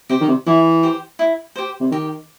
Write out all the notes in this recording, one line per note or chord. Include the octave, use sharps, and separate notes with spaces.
C3 G4 C5
D#3
C3
E3 E4
G4 C5
E4
G4 C5
C3
D#3 G4